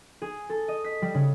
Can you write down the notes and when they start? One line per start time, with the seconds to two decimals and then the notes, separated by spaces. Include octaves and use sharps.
0.22 G#4
0.50 A4
0.68 D#5
0.84 B6
1.02 G3
1.14 C#3